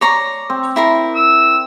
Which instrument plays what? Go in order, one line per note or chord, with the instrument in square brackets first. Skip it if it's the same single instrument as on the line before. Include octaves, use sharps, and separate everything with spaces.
[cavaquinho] C#5 A#5 C6 [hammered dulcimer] D5
[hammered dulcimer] C4
[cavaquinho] E4 A#4 C6
[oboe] E6